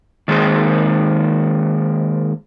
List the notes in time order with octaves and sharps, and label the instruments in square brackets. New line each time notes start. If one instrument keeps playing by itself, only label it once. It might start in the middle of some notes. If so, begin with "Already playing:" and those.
[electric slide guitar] D#3 G#3 A#3 G#4 C5